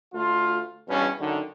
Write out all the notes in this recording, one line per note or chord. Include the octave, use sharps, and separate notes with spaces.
D2 A3 F4
E2 G2 B2 C#4
F#2 D3 D#3